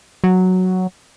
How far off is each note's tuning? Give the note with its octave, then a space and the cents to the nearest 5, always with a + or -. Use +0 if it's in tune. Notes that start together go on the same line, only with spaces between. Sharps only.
F#3 +0